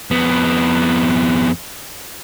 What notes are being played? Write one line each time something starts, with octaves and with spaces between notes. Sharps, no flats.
F2 B3